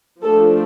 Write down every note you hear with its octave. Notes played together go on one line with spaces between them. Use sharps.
F3 A3 D4 A4